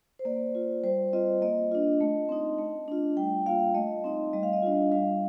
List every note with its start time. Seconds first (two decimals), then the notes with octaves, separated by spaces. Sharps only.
0.19 C5
0.25 A#3 D5
0.55 F4
0.84 G3 C5
1.13 C4 F4 D#5
1.42 A#3 D#5
1.71 D4 F4
2.01 A3
2.29 C4 D#4
2.59 A3
2.88 D4 F4
3.17 G3 G5
3.46 A#3 F4 F5
3.74 A3 D#5
4.04 C4 D#4
4.33 G3 D#5
4.43 F5
4.53 D#5
4.62 D4 F4
4.92 G3 F5